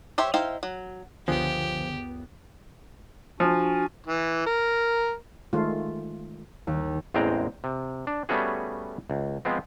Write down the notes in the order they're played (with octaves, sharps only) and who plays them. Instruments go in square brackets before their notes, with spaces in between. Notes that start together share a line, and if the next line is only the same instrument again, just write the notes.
[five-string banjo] G4 C5 C#5 E5
D#4 E4 C5 F5 G5
F#3
[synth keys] C#2 F#2 B3 [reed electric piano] D3 G#5 [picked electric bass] F3 [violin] G4
[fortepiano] F3 [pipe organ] D4 F#4 G#5
[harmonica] E3
A#4
[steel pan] D#3 G#3 A3 F4
[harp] D#2
[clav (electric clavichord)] A1 E2 G#3 C4 G5 A#5
C3
D4
G3 A3 B3 C#4 F#4 G#4
C#2
F3 G#3 B3 C4